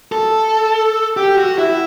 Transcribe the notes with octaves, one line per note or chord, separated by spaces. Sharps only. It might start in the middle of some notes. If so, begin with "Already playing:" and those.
A4
G4
F#4
E4